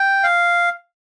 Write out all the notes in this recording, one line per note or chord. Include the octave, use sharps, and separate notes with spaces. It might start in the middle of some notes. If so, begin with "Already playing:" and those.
Already playing: G5
F5